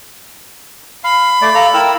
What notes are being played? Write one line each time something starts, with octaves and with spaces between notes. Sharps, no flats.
F5 B5
A3 D5
A4 F5 A#5
E4 A#4 G5 E6